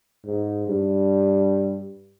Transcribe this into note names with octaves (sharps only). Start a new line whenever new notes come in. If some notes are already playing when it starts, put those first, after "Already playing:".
G#2
G2